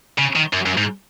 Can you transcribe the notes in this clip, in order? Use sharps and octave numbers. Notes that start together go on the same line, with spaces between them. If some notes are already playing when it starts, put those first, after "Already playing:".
C#3
D#3
F#2
F#2
G#2